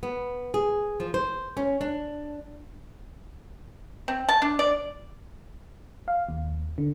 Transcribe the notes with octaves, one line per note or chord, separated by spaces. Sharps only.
B3
G#4
F3
C5
C#4
D4
C4
A5
D4
D5
F5
D#2
D3